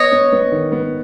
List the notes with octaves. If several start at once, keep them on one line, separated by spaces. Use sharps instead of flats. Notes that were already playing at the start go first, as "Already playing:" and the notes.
Already playing: B3 C#5 D#5
B3
B3
D#3
B3